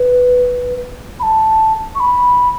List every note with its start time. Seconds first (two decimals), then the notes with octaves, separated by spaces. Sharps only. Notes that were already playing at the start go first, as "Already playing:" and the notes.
Already playing: B4
1.20 B5
1.23 A5
1.95 C#6
2.00 B5